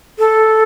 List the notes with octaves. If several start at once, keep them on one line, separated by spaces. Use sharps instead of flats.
A4